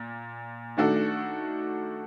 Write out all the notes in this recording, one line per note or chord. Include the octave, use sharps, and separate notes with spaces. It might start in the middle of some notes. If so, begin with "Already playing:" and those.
Already playing: A#2
D#3 A3 D4 F#4 A4